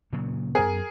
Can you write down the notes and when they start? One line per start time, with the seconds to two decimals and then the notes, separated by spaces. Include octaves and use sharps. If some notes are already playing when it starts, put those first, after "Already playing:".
0.13 A#2 C#3 F#3
0.55 F#2 B3 G#4 A#4 G#5